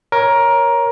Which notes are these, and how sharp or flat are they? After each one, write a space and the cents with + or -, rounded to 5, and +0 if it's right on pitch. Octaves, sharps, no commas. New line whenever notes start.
A#4 +15 C#5 +0